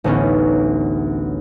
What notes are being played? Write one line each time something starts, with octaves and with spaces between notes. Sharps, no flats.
A1 D2 B3 C#4 D#4